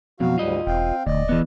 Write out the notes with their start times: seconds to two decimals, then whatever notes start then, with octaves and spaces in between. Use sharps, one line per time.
0.20 F2 B2 F#3 F#4 F5
0.38 D2 G#2 G3 F4 D#5
0.67 E1 C4 F5 G5
1.06 D#1 D2 D5 D#5
1.29 E3 B3